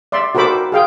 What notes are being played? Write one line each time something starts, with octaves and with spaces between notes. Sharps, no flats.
D5 E5 C6
F#4 A4 A#4 C5 B5 D6
G#4 F5 G5